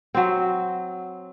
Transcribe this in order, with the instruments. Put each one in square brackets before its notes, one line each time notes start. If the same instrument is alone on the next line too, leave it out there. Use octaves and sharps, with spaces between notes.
[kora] F#3 C4